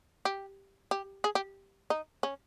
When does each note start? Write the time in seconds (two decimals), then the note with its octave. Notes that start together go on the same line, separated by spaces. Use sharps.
0.25 G4
0.91 G4
1.24 G#4
1.35 G4
1.90 D#4
2.23 C#4